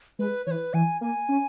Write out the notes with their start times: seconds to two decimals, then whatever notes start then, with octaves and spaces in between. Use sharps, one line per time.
0.19 G#3 B4
0.46 E3 C#5
0.51 B4
0.74 E3 G#5
1.01 A#3 G#5
1.29 C#4